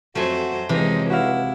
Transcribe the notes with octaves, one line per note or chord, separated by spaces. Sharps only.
F2 F#3 A3 F#4 C5 G#5
C#2 C3 E3 F3 G#3 D#4
E4 F#4 F5